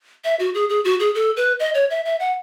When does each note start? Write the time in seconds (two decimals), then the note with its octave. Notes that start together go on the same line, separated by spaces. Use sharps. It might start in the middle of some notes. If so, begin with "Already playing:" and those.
0.24 E5
0.40 F#4
0.54 G#4
0.70 G#4
0.85 F#4
1.00 G#4
1.15 A4
1.37 B4
1.60 D#5
1.74 C#5
1.90 E5
2.05 E5
2.20 F#5